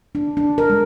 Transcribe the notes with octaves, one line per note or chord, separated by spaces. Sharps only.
D4
D4
A#4
G#3